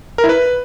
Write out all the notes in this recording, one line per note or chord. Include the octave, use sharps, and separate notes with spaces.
A#4
E4
B4